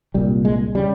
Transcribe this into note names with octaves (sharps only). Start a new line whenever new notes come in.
C2 A#2 G3
G#3
C#3 G3